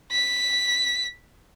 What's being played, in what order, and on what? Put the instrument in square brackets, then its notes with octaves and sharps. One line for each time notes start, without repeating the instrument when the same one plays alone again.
[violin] B6